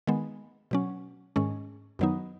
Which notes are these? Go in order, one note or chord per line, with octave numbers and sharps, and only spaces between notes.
D#3 G#3 B3
B2 F#3 C#4
G#2 D#3 G#3 C#4
F#2 D#3 F#3 B3 D#4